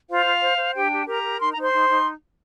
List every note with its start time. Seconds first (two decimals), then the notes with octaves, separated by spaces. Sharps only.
0.09 F4 C5 F5
0.25 F4
0.42 C5
0.58 C5
0.74 D4 G4 G5
0.91 G4
1.06 G4 A#4 A#5
1.24 A#4
1.39 D#4 C6
1.51 D#4 A#5
1.61 C5 C6
1.72 D#4
1.88 D#4